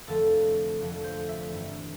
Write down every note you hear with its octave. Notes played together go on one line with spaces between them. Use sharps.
F1 F2 D3 F3 A3 A4
F1 F2 D3 F3 A3
C5
E5
A1 G2 E3 A3